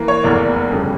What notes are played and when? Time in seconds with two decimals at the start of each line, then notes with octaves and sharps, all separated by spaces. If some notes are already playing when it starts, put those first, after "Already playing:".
Already playing: E3 A#3
0.08 C#5
0.23 F1 E2 E3 A#3 D5
0.70 G1 F2 C#3 G3